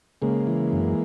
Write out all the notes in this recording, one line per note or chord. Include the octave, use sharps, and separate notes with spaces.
C#3 G#3 A#3
E3
F#2